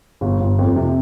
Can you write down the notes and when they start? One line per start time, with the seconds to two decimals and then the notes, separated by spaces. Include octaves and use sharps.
0.21 G1
0.40 G1
0.59 F2
0.76 C3